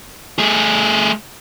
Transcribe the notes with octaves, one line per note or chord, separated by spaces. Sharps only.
A3 G#4